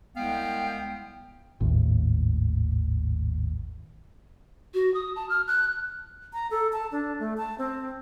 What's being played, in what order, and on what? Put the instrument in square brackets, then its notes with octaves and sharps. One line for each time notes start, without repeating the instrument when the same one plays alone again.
[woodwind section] C2 G#3 B3 F5 G5
[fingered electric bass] G#1 D#2 A2
[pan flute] F#4
D#6
A5
F6
F#6
[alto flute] A#5
A4
A5
D4
A3
A5
C4